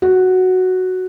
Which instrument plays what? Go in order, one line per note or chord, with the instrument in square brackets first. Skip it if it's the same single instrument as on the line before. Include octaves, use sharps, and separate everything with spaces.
[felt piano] F#4